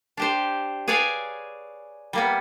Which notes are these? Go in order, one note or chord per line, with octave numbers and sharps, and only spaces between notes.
D4 G4 C5
G#4 B4 C#5 D5 F5 G#5
G3 A#3 B3